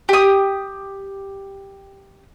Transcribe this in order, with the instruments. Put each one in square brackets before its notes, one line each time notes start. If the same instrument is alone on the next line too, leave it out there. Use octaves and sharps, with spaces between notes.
[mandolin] G4 D#6